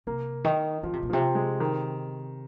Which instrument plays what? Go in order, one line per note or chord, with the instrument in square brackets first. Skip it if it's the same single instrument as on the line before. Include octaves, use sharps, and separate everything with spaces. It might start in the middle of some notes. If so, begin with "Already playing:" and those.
[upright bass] C3 [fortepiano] A#3
[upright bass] D#3
[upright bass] D#3 [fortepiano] F3
[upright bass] C3
A#2
[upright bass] C3 [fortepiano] F3
[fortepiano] G#3
D#3